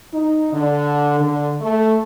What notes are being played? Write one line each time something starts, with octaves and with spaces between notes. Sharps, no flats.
D#4
D3
D3
A3